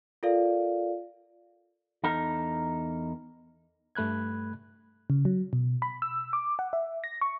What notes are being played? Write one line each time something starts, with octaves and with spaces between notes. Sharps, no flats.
F4 A4 A#4 D5 F5
E2 D#4 A4 A#4
G2 A3 B5 F#6 G#6
C#3
F#3
B2
B5
E6
D6
F#5
E5
A#6
C#6